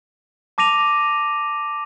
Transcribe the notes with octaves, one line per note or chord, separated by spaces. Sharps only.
A5 D6 A#6 D#7 F7